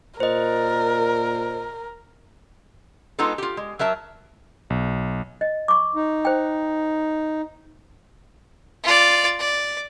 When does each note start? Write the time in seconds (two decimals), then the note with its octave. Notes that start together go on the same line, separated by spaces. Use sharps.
0.20 A#2 A#4 C5 D#5
3.19 G#3 B3 D#4 F4 A4
3.38 F4 G4
3.57 G#3
3.79 F#3 A#4 E5 A5
4.70 B1
5.41 D#5
5.68 C#6 D6
5.95 D#4
6.25 C5 G5
8.84 F4 D5
9.40 D5